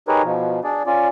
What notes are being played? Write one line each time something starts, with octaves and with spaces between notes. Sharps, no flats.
D#4 G4 G#4 A#4 B4 C#5
B2 F3
D4 G#4 D5
C#4 F4 D5